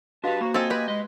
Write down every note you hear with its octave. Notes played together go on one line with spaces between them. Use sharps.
D4 F#4 G4 B4 D#5 F5 A5
A#3 F#4 C5 A#5 B5
C4 F4 F#4 A4 D#5 G#5
G4 B4 C6
G#3 D#5